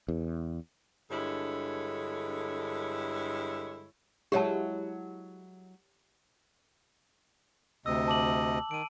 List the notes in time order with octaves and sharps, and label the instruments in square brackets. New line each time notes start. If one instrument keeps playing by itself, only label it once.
[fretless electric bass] E2
[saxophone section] G2 D3 G#3 E4 A4 C#5
[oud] F#3 G#3 E4 [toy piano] G4 C#5 A5
[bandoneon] D2 C3 D#5 [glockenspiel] E6
[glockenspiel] A5 D6 F#7
[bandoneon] D#3 [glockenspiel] D7 D#7